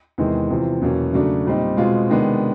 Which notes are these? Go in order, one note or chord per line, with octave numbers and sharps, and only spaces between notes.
E2 C3 D#3 G#3
E2 C3 F3
E2 B2 F#3 A#3 C#4
C#3 F#3 A3 D4
A#2 G3 C4 D#4
B2 G#3 C4 F4
C3 D#3 G#3 B3 D4